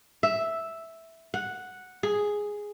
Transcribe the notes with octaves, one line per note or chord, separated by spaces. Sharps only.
E5
F#5
G#4